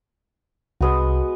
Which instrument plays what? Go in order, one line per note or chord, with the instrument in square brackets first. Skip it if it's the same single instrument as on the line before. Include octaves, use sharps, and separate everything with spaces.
[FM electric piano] C2 [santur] G#3 B3 F#4